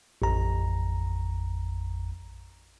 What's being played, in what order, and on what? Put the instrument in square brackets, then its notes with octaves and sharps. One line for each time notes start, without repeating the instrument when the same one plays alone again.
[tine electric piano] A1 F2 A#5